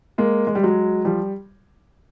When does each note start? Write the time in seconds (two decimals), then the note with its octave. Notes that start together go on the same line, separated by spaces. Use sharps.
0.18 G#3 A#3
0.47 G#3
0.55 G3
0.63 F#3 G#3
1.05 F3 G3